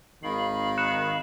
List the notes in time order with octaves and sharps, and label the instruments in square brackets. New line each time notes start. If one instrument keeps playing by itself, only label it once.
[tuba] G#1 [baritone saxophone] D#3 [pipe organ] F5 B5
[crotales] F#6 C#7 E7